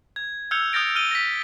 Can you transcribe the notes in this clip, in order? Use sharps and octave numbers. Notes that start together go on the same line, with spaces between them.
G#6
E6 F6 G6 G#6 C#7 F7
D#6 F6 G6 A6 A#6 D7
F6 D#7 G7
A#6 B6